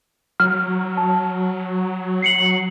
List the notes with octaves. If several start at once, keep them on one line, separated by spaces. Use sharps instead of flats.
F#3 F6
A5
C7 C#7 F#7